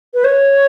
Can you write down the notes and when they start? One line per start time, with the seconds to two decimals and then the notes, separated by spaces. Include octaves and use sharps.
0.14 B4
0.24 C#5